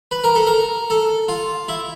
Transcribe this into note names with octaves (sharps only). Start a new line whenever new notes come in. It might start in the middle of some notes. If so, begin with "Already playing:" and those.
B4
A#4
A4
A#4
A4
F4
E4